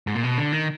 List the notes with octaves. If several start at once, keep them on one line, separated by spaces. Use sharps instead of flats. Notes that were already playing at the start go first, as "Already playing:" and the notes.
G#2
A#2
B2
D3
D#3